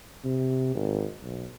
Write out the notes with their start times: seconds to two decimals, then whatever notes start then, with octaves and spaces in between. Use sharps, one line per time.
0.24 C3
0.75 G#1
1.23 B1